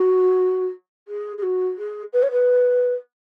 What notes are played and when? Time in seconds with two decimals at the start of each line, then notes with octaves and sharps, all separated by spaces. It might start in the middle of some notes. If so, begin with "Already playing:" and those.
Already playing: F#4
1.08 G#4
1.38 G#4
1.42 F#4
1.78 G#4
2.13 B4
2.22 C#5
2.31 B4